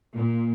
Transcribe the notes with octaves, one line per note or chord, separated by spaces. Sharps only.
A#2